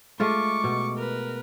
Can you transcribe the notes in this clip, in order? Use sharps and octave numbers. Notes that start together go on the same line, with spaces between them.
G#3 A3 F4 C#6 D6
B2
A#4 B4